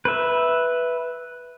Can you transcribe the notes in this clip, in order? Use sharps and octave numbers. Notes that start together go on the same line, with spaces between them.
B4 E5